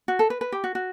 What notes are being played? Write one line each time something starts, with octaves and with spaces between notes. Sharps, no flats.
F#4
A4
B4
B4
G4
F#4
F#4